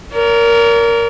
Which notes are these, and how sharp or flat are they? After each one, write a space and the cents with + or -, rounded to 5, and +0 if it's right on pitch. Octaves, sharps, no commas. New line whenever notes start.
A#4 +0 D5 -45